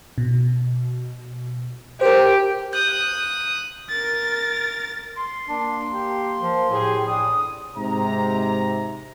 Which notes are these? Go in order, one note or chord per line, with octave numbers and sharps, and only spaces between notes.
B2
G4 A#4 C5
D#6 F#6 G6
A#4 A6
C6
A#3 D4
G4
F3
A2 G4 G#4
A1 D4 D#6
G#2 C3 A#5